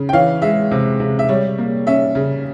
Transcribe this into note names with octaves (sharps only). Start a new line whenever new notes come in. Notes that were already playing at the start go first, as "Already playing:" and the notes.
Already playing: C#3
G5
E3 C#5 F5
G#3 E5
C3
C3
E5
G3 C#5
A#3
C#4 E5
C#3